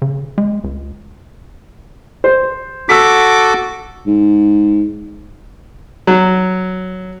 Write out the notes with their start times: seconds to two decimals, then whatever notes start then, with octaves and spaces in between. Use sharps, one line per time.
0.02 C#3
0.38 G#3
0.64 C#2
2.24 C5
2.89 F#4 A4 D6 E6 B6
4.07 G#2
6.07 F#3